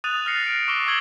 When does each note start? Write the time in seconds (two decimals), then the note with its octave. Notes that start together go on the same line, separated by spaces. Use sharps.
0.04 D#6 F#6 A6 D#7 F7
0.26 F6 F#6 A6 A#6 C7 C#7
0.46 D7
0.68 C#6 D6 E6 A#6 G7
0.86 C#6 D6 E6 G#6 F#7 G7